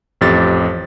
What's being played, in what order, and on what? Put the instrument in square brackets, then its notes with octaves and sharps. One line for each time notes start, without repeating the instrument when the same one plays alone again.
[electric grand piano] A1 F2 G4 A6